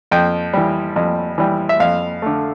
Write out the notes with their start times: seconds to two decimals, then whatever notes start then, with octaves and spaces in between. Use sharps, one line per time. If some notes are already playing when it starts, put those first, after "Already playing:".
0.11 F2 G5
0.53 E3 G3
0.96 F2
1.38 E3 G3
1.69 E5
1.80 F2 F5
2.22 D3 A3